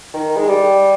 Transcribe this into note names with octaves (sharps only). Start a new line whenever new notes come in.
D#3
G#3
G3